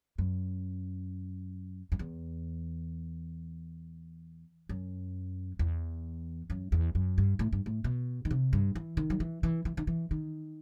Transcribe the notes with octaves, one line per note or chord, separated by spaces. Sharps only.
F#2
F#2
E2
F#2
E2
F#2
E2
F#2
G2
A2
G2
A2
B2
D#3
C3
G2
E3
D#3
F#3
E3
E3
E3
D#3
E3
D#3